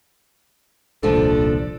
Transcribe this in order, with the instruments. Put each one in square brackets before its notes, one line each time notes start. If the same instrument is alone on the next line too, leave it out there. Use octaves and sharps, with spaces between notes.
[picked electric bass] D#1 C2 A#2 [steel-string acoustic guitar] F3 D4 [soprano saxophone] A4